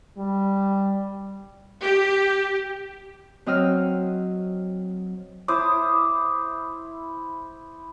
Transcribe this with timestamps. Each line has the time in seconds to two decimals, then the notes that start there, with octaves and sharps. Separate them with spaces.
0.18 G3
1.80 G4
3.46 F#3 C4 D#5 E6 F6
5.48 E4 C5 D6 D#6